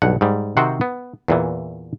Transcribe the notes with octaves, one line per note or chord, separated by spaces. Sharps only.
B1 G2 F#5
G#2 G3
C3 D#3 C4 F#4 C5 F#5
B3
E2 A#2 E3